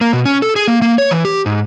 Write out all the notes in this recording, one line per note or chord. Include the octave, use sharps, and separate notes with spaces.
A#3
B2
C#4
A4
G#4
A#3
A#3
C#5
E3
G4
G#2